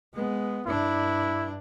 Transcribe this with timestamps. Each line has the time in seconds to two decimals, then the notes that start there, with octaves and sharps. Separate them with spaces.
0.13 G#3 B3
0.67 G2 D4 E4